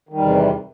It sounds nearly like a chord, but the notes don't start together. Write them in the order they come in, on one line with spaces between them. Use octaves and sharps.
D#3 G3 E2 C3